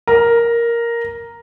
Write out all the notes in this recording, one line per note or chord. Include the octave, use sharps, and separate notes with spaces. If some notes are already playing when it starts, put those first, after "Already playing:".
A#4